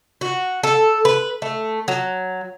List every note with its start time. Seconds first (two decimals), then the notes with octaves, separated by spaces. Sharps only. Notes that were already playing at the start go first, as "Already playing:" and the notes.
0.21 F#4
0.63 A4
1.05 B4
1.42 A3
1.88 F#3